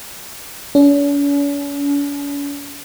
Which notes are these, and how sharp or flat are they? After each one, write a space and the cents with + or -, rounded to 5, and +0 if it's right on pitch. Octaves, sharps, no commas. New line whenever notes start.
C#4 +45